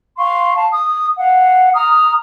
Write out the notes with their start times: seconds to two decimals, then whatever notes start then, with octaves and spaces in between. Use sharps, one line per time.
0.17 F5 C6 C#6
0.56 F5 A5
0.71 D#6
1.19 F5 F#5
1.74 A#5 D#6 F6